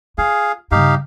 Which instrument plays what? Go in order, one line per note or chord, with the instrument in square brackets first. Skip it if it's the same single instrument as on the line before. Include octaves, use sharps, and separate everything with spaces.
[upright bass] F4 [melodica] G#4 F5
[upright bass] G2 C#3 [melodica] D#4 G4 F5